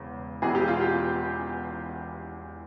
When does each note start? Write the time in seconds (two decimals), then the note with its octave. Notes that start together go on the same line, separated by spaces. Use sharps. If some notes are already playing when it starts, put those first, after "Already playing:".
Already playing: E1 E2 C#3
0.42 E1 E2 E3 G#4
0.55 G4
0.68 F4
0.81 G4